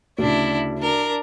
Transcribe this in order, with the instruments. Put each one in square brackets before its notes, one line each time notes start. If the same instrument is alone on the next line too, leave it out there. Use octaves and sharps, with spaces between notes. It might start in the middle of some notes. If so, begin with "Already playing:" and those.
[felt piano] D2 C#3 [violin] D4 E4
[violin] D4 A#4